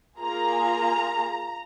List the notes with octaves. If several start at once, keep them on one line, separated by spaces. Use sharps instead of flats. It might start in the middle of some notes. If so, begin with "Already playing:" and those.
A#3 F4 G#4 A#5